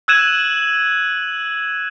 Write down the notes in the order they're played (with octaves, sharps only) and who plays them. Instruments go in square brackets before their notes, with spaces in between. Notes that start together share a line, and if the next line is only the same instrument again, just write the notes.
[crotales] E6 F#6 G#6 D#7 E7 F#7